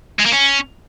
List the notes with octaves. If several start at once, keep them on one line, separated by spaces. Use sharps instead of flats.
G#3
A#3
C#4